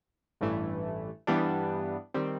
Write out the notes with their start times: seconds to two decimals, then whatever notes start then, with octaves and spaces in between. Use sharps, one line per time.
0.41 A1 G2 E3 A3
1.27 G2 E3 G3 B3 D4
2.14 D#3 G3 C4